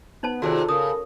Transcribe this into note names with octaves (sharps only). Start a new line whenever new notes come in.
B3 D#4 C5 A5
D#2 C3 F4 F#4 G#4 A4 C5 D5
C#3 A#4 D#6